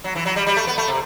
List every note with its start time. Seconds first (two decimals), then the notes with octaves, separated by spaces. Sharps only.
0.04 F#3
0.15 E3
0.26 F#3
0.36 G3
0.47 G3
0.57 A3
0.67 B3
0.78 A3
0.88 C3